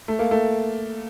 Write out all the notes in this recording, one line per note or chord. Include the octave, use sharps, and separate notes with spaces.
A3
A#3
A3